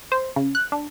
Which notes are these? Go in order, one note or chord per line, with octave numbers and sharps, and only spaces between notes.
C5
C#3
F#6
D4